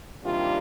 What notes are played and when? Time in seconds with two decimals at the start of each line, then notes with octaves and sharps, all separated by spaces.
0.23 C3 D#3 G3 A#3 D4 F4